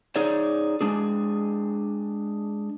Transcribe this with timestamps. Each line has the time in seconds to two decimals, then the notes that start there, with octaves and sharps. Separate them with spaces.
0.16 D#4 G#4 C#5 D5
0.81 G#3 D4 G#4